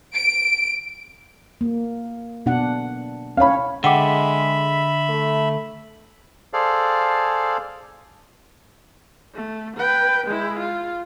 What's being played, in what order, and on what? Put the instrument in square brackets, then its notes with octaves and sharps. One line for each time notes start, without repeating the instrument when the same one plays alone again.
[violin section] D7
[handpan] A#3
B2 D4 F#5
[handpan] C#4 C#5 [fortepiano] F5 B5
[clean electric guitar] D3 [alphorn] G#3 [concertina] E5 B5 [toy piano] F#5 G5 D6
[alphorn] A3
[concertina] G#4 A4 C5 D5 F5
[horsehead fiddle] A3
B4 G5
G#3 E4
F4